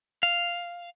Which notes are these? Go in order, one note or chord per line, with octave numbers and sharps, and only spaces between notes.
F5